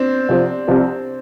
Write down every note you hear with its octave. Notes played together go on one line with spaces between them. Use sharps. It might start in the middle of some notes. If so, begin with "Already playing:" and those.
Already playing: C4 D4
C2 C3 F3
C2 C3 F3